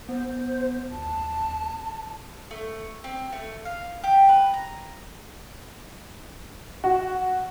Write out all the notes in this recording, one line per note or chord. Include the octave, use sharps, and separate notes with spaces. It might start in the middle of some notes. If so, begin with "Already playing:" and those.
B3 C5
D#2 A5
A3
C4
A3
F5
G4
B4
A#5
F#4